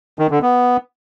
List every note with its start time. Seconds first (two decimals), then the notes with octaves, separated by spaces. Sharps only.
0.19 D#3
0.31 D3
0.42 B3